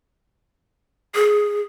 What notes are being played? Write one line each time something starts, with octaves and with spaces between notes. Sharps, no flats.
G#4